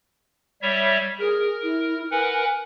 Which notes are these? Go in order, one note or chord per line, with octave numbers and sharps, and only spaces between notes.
G3 C#5 E5
G#4 A#4
E4
A#4 B4 F#5 G#5